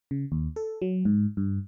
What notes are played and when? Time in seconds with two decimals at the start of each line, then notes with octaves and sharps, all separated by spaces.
0.11 C#3
0.32 D#2
0.56 A4
0.82 F#3
1.05 G#2
1.37 G2